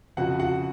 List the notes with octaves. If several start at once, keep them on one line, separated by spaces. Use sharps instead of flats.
F2 C#3 F3 F#4 F#5
F#4 F#5